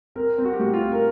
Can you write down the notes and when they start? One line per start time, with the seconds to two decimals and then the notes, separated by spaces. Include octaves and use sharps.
0.15 C4 A#4
0.38 C4
0.45 F#4
0.53 G4
0.59 A2 F#4
0.73 F4
0.81 C4
0.92 A#4